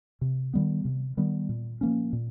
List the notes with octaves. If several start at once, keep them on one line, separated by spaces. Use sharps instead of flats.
C3
D#3 G3 B3
C3
D#3 G3 B3
A#2
F3 A#3 C#4
A#2